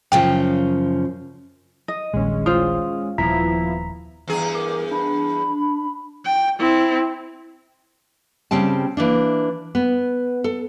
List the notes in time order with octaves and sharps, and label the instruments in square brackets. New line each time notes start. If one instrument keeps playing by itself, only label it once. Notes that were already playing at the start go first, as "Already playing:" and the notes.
[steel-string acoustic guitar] F#2 C#3 F3 [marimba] G5
[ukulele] D#5
[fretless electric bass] D#1 A#1 D#2 [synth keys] G#3 C#4
[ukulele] F4 C5 [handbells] D#6
[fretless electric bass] D#1 [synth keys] F3 B3 E4 [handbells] A#5 B6
[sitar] E2 G2 G#4 [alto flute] A#5
[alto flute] A#4 [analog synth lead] D6
[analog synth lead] D4 [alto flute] B5
[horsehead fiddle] G5
C4 E4
[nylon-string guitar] C#3 G3 C4 G5 A5
E3 A#3 D4
B3
A4